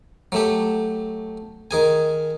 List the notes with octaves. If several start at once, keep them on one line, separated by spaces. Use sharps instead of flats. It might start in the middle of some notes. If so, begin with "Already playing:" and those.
F#3 A3 G4
D#3 G#4 G#5